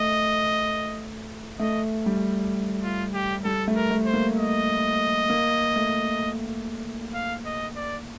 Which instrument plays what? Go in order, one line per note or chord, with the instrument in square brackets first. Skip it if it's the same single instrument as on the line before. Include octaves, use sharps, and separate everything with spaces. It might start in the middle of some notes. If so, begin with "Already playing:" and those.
Already playing: [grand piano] A3 [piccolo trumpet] D#5
[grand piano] A3 [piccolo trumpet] D#5
[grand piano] G3
[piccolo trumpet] F4
G4
[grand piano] G3 [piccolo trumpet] A4
[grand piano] A3
[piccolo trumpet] A#4
[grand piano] A3
[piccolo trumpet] C5
[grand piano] A#3
[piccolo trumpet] D#5
[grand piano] A#3
A3
[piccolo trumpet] F5
D#5
D5